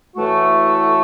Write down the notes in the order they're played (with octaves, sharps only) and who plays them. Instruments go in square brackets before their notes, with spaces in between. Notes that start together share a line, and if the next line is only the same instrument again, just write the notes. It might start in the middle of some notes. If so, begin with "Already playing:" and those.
[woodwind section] A2 E3 A3 F#4